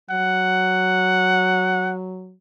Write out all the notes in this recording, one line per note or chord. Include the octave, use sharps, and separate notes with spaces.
F#3 F#5